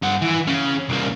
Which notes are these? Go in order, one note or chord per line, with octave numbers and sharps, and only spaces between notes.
G2 F#5
E3
C#3 C#4
C2 A#3